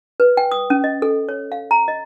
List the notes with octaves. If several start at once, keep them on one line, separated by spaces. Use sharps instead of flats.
B4
G5
D#6
C#4
D#5
A4
C#5
F5
A#5
D#5